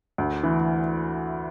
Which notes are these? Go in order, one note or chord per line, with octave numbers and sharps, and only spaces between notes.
D2
E3